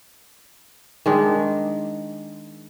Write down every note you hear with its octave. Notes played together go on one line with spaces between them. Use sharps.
D#3 G#3 D4